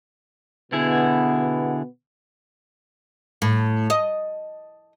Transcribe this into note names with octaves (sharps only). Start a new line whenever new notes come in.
B2 D3 B3 E4 G#4
A2
D#5